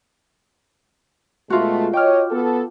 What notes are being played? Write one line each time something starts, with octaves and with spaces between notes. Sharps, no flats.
B2 G#3 A3 F4 F#4
C#5 D#5 G5 D6 F6
B3 A4